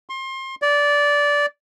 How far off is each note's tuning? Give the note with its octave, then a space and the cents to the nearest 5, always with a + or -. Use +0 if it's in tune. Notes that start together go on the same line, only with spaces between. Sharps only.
C6 +30
D5 -15